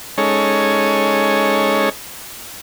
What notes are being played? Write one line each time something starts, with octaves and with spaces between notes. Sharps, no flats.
G#3 C#4 D#4 A4 C#5